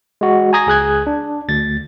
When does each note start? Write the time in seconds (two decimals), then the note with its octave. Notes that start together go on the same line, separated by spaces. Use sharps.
0.21 G#3 F#4
0.53 G#5 A#5 D#6 G#6 A#6
0.67 C#2 G#4 F#6 G#6
1.07 D4
1.49 D2 A6